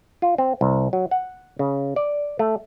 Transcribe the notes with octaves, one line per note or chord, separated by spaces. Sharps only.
F4
C4
C2
F#3
F#5
C#3
D5
A3